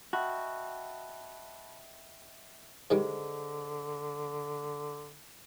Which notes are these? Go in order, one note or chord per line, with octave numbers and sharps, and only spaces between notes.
F#4 D#5 E5 G5 A5 B5 F#6
G#2 D3 D#3 G3 G#4 C5 D#5